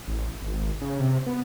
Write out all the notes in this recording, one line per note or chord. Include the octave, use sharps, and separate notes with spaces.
A1
G#1
C#3
C3
B3